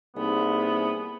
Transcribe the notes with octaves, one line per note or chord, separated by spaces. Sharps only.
C2 A#3 B3 D#4 G#4